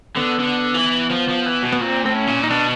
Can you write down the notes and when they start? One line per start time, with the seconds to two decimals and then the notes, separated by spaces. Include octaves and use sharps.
0.16 D3 B3
0.40 D3
0.74 E3
1.10 F3
1.28 F3
1.46 E3
1.63 B2
1.73 B3
1.81 A#2 C4
2.04 A2 C4
2.15 C#4
2.27 A#2
2.44 D#4
2.50 B2 D4